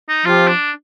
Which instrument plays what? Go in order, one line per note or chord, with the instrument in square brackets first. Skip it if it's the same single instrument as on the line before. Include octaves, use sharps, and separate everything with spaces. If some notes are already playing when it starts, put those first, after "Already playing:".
[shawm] D#4
[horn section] F3 C4 G4 [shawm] F4
[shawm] D4